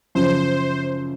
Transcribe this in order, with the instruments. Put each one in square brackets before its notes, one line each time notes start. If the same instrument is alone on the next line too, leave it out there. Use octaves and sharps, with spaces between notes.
[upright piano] F#2 C#3 F3 [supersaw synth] C5